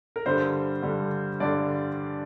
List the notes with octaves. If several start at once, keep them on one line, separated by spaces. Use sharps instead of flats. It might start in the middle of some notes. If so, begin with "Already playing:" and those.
A#4
G2 D3 G3 C5
G2 D3 G3
G2 D3 G3 D5